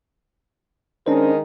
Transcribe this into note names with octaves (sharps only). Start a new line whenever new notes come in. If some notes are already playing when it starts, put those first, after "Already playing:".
D#3 G#3 C#4 D4 A#4 C5